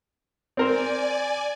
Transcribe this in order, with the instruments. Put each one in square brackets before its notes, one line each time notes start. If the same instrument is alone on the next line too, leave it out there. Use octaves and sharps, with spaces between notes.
[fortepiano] C4 A#4 C5 [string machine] D5 G#5